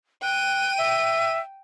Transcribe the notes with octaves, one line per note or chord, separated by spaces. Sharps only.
G5 F#6 D#7
E5